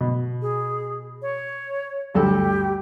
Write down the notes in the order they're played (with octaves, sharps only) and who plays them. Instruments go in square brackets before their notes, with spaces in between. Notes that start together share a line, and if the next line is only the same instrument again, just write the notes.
[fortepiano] B2
[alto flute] G#4
C#5
[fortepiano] D2 G2 A4 [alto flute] G4